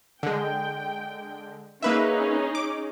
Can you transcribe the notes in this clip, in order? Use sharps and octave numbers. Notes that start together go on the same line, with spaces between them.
D3 G#3 G5
A#3 C#4 D#4 G#4 B4 E5
D6